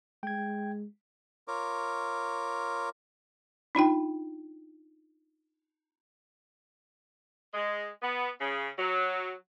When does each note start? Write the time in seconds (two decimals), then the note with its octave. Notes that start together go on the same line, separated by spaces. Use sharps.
0.23 G#3 G5 G#6
1.48 F4 A#4 C#5 D6
3.75 D4 D#4 F4 G5
7.54 G#3
8.02 B3
8.40 C#3
8.78 F#3